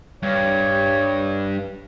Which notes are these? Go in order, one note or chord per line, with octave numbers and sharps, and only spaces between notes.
G2 C#5